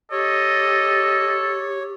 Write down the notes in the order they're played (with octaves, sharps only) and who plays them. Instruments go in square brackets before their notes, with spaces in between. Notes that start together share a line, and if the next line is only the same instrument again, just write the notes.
[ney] G4 [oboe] A4 [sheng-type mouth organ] C#5 [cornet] D#5